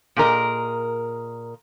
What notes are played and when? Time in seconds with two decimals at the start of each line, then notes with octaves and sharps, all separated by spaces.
0.16 A#2 G#4 A#4 D#5